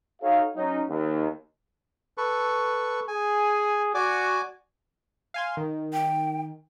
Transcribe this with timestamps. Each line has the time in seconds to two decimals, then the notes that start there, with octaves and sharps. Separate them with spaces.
0.21 D#4 F#4 A4 C#5 F5
0.56 F#3 C#4 D#4
0.89 D#2
2.18 A4 B4 C#6
3.08 G#4 G#5
3.95 F#4 D5 G#5 D6
5.34 F5 G#5 C6
5.57 D#3
5.93 G5